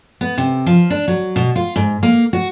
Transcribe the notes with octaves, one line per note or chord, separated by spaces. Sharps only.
B3
C3
F3
D4
F#3
B2
F4
G#2
A#3
F#4